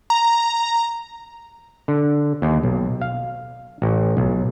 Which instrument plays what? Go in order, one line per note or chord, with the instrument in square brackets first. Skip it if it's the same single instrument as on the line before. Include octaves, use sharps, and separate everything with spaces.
[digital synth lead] A#5
[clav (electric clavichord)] D3
D#2
B1
F5
A1
B1